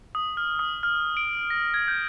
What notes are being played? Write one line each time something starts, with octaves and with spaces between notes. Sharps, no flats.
D#6
F6
D#6
F6
D7
A#6
G#6
G6